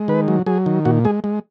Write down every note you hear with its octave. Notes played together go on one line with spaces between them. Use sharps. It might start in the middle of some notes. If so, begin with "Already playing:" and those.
Already playing: G#3
D#3 B4
F#3
F#3 G#4
D#3
A#2 F#4
G#3 G#4
G#3